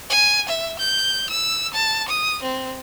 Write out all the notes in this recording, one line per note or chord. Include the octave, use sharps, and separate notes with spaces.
G#5
E5
G6
E6
A5
D#6
C4